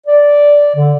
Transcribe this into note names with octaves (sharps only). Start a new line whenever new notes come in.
D5
D3